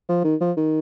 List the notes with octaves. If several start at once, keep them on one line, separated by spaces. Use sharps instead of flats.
F3
D#3
F3
D#3